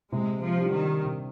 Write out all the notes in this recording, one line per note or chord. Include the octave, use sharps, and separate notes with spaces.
C3 G#3
F3
G3 D4 G4
D#3
C3